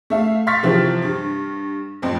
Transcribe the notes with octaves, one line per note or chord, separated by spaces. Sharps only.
A3 E5 F5
F5 C6 C#6 F6 A6 B6
C3 E3 F3 C4
G2
A1 F2 C4